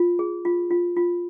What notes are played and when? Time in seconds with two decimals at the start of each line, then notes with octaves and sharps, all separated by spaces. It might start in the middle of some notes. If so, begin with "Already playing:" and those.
Already playing: F4
0.19 G#4
0.45 F4
0.70 F4
0.96 F4